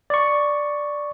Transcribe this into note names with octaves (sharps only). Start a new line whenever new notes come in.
D5 C#6